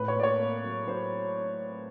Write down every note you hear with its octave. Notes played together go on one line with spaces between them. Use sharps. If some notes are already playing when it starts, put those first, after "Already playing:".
Already playing: A2 B4
C#5
A#3 D5
C#5
A#3
F#3
F#3 C5